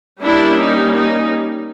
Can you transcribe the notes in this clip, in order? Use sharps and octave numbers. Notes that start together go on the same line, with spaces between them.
G3 A#3 C#4 D4 E4
D#4
D#4